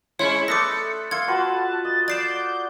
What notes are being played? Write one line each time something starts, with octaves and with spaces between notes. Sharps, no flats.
G#3 C#4 E4 C#5 C6 C#7
A3 A4 B4 D5 D6 D#6 A#6
E5 F5 C6 G#6 C#7
F4 F#4 B4 A5
D#5 A6
D5 G6 A6 C7 E7